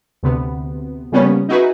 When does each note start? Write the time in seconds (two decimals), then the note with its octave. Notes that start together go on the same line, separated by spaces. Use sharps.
0.23 D2 C3 B3
1.12 C#3 F3 G3 A#3 B3 C#4
1.49 D#4 E4 F#4 G#4 B4